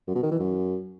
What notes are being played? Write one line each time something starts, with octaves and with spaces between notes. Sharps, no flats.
F#2
B2
D#3
E3
F#2